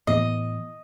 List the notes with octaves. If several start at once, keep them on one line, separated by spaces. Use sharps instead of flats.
A2 E3 B3 D#5